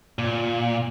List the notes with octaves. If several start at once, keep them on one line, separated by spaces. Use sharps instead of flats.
A#2